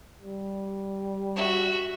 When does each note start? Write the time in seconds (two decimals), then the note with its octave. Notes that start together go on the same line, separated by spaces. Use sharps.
0.22 G3
1.35 F#4 E5